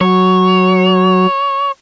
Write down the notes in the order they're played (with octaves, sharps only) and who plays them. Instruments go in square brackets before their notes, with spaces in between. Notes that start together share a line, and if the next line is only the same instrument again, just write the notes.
[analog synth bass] F#3 [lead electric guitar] C#5